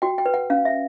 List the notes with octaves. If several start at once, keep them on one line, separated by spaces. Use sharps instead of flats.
F#4 G5
G5
B4
F#5
C#4 F5
E5